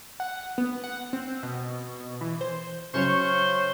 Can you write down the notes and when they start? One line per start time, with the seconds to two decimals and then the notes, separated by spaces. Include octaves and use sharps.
0.20 F#5
0.58 B3
0.84 F#5
1.13 C4
1.43 B2
2.21 E3
2.41 C5
2.94 C#3 F#3 C#4 C5 C#5 C#6